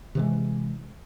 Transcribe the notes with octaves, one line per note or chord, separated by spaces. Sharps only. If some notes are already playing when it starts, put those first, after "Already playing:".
C3 E3 G#3